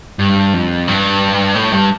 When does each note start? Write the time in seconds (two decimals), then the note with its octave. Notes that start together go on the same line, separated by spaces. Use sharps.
0.19 G2
0.54 F2
0.87 G2
1.55 A2
1.72 G2